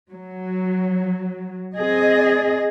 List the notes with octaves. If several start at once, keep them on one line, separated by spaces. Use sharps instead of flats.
F#3
C4 G#4 D#5